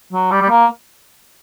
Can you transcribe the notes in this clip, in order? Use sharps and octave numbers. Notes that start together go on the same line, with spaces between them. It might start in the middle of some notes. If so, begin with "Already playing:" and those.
F#3
G3
G3
A#3